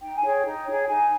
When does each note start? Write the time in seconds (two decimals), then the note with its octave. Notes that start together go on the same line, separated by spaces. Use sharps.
0.01 D#4 G5
0.16 G#5
0.22 G#4 C#5
0.29 G5
0.44 D#4
0.65 G#4 C#5
0.86 D#4 G#5